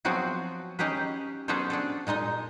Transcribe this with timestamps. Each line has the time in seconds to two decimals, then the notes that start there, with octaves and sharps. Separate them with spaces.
0.05 F3 F#3 B3 C4 F#4 G#4
0.79 C#4 D#4 G4 G#4 B4
1.48 F#3 B3 C#4 G#4 A4 C5
1.70 D4 G#4 A4
2.07 A#2 G#3 D#4 D#5